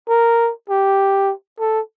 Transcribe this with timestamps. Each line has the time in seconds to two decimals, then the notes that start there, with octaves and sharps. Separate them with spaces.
0.09 A#4
0.70 G4
1.59 A4